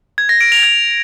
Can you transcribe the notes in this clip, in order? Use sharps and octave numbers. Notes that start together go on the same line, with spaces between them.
G#6
A#6
D7
F7
G#6